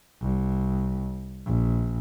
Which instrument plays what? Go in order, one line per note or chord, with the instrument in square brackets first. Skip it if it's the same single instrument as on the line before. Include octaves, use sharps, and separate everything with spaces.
[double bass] C2
A#1